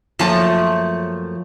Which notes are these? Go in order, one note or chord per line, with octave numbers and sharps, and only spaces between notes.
F#2 F3 A3 A#3 C#5 A5